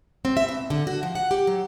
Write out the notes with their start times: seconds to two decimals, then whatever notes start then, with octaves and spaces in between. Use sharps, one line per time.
0.25 C4
0.37 E5
0.48 B2
0.70 D3
0.87 F#4
1.03 F3
1.15 F#5
1.31 G4
1.47 F#3